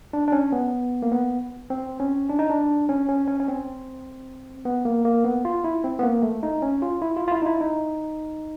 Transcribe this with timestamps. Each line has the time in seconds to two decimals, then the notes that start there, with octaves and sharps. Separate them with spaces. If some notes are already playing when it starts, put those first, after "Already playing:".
0.13 D4
0.28 D4
0.32 C#4
0.52 B3
1.02 A#3
1.11 B3
1.70 C4
2.00 C#4
2.29 D4
2.39 D#4
2.50 D4
2.89 C#4
3.09 C#4
3.28 C#4
3.40 C#4
3.48 C4
4.65 B3
4.85 A#3
5.05 A#3
5.24 B3
5.45 F4
5.64 E4
5.84 C4
5.99 B3
6.03 A#3
6.23 A3
6.43 D#4
6.62 C#4
6.82 F4
7.02 E4
7.17 F4
7.28 F4
7.32 E4
7.42 D#4
7.46 E4
7.61 D#4